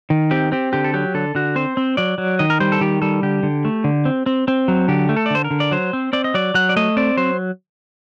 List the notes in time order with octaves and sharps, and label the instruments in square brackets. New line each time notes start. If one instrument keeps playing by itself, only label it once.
[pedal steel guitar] D#3
C4 G4
C4 G4
D3 G4
A4
F#3 G4
D3 A4
D3 F#4
C4 C5
C4
F#3 D5
F#3
D#3 D#5
A#4
G3 C5
A4
D#3 G4
G3 A4
D3 G4
D3
A3
D3
C4
C4
C4
F#3
D3 G4
A3
A4
D5
D3 C5
A#4
D3
D5
F#3 C5
C4
C4 D5
D#5
F#3 D5
F#3 F#5
D5
A3 D#5
C4 D5
F#3 C5